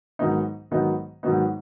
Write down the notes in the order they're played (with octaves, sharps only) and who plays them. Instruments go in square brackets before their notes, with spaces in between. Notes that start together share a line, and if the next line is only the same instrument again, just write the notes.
[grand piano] G#2 D#3 F#3 B3 D#4
G#2 D#3 F#3 B3 D#4
G#2 D#3 F#3 B3 D#4